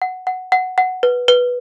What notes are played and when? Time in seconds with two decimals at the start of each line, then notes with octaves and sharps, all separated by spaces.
0.02 F#5
0.27 F#5
0.52 F#5
0.78 F#5
1.03 B4
1.28 B4